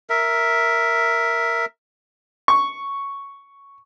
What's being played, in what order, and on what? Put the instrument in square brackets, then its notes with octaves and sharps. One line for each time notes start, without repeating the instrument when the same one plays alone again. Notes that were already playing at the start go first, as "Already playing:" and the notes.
[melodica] A#4 E5
[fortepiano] C#6